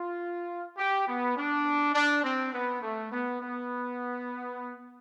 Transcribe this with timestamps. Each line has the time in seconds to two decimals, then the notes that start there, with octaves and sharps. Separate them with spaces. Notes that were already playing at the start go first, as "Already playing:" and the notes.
Already playing: F4
0.78 G4
1.07 B3
1.37 D4
1.95 D4
2.24 C4
2.53 B3
2.82 A3
3.12 B3
3.42 B3